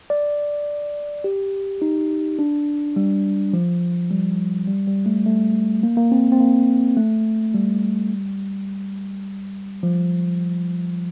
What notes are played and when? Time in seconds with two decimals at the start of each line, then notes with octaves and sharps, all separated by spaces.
0.10 D5
1.24 G4
1.82 D#4
2.39 D4
2.96 G3
3.54 F3
4.10 G3
4.68 G3
4.87 G3
5.06 A3
5.26 A3
5.83 A#3
5.97 A#3
6.12 C4
6.32 C4
6.40 A#3
6.97 A3
7.54 G3
9.83 F3